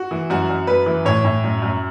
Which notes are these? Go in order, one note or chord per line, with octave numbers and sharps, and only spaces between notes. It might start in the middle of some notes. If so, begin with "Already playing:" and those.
Already playing: F#4
E3
F#2 F#4
F#2
F#2 B4
E3
A2 C#5
A2
F#2
F#2